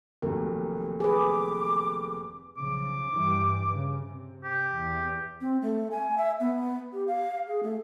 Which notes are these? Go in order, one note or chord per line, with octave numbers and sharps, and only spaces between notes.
F1 D#2 F#3 A#4
G#4 B4 D6
B1 C#3 F3 D6
G2 E3 G3
C#3
C3
G4
E2
C4
A3
G#5
E5
B3
G4
F5
G#4
A3